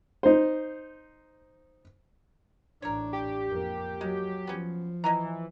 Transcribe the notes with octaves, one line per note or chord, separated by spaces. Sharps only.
D#4 C5
A1 D4 A#4 C#5
G4
F2 A#3
F#3 G#3
F3 B3 C#4
E3 D#5 G#5 A#5